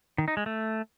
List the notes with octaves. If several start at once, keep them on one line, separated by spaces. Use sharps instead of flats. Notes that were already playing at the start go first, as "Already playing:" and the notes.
D#3
D#4
G#3
A3